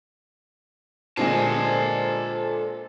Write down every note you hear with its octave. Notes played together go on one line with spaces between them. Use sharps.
A#2 D3 G#3 A4 C5 G#5 A5